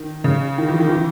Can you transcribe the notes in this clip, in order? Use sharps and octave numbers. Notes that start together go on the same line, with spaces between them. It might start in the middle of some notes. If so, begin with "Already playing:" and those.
Already playing: D#3
C#3
D#3
E3
D#3
E3